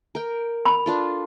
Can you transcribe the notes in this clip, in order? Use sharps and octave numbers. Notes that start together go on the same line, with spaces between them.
A#4 G5
B5
D4 F4 A4